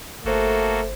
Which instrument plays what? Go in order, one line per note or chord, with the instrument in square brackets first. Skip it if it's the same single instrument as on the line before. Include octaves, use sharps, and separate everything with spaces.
[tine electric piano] G1 C5 [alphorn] A3 [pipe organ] A#3 F#4 A4